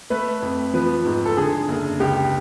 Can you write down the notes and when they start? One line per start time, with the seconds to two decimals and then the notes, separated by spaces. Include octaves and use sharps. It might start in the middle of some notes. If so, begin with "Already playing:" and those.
0.10 A3 B4
0.42 F2
0.74 F3 B4
1.05 G#2
1.25 A4
1.37 D3 G#4
1.69 F#1
2.00 C#2 G4